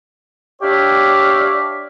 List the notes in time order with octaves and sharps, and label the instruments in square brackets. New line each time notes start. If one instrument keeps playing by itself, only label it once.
[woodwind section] D4 G4 C#5 D5 E5 F5